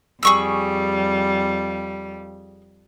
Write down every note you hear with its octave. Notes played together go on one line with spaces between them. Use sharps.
F2 G3 G#4 C#6 E6